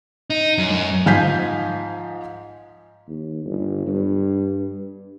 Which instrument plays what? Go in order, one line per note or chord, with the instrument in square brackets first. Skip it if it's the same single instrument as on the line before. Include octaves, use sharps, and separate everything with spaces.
[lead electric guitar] D#4
F#2
F#2
[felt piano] G#2 F3 F5 G#5 G6 B6
[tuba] D#2
G1
G2